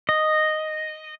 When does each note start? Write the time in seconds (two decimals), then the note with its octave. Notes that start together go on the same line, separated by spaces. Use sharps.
0.09 D#5